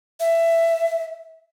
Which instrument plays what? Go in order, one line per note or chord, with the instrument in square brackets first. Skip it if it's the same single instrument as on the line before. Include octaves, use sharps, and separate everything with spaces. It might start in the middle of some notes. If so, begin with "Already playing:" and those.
[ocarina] E5